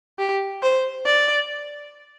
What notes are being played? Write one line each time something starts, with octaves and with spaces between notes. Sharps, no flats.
G4
C5
D5